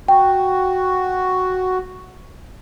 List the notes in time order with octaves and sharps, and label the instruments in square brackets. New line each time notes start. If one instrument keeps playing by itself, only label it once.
[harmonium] F#4 [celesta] G5